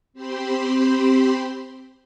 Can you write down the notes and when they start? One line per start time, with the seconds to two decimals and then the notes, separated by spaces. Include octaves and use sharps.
0.13 C4 G4 C5 B5 C6